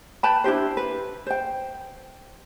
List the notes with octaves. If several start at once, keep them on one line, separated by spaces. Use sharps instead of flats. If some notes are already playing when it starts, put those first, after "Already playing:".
B4 G5 A5 B5
D4 E4 G4 C5
B4
C5 G5